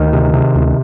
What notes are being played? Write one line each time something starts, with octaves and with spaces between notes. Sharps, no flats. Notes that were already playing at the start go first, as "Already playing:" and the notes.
Already playing: D2 D#3
C3
C3
D2